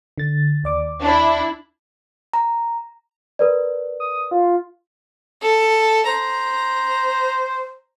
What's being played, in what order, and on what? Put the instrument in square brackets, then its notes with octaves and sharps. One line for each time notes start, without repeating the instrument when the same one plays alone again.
[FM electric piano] D3 A6
D#2 D5 D6
[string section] D4 E4
[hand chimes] A#5
[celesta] A#4 B4 D5
[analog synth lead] D#6
F4
[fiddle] A4
[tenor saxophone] C5 [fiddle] A#5